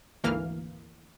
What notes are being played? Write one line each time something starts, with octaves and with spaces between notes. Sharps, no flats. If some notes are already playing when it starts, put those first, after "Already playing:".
G#1 D2 E3 A#3 F5 F6